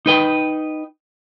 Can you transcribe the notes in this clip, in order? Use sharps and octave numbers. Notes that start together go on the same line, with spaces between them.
D#4 B4 G5